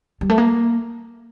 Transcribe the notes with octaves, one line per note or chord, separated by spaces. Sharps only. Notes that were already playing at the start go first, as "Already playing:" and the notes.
G3
A3
A#3